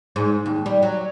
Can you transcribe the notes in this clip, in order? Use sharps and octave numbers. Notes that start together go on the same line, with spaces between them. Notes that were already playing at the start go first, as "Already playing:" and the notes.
G#2
D#2
G3
F#3